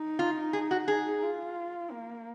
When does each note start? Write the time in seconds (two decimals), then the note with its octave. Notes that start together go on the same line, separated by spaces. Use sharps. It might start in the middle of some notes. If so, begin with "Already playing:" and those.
Already playing: D#4
0.19 F4
0.53 G#4
0.71 F#4
0.88 D#4 G#4
1.22 F4
1.91 A#3